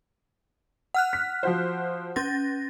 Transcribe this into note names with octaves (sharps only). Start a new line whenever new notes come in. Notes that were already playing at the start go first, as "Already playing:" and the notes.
F#5 F6 F#6
B6
F3 F#4 C5
C#4 G6 A6 A#6